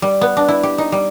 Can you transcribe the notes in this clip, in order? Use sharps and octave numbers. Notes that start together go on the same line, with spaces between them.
G3
B3
D4
E4
G4
D#4
G3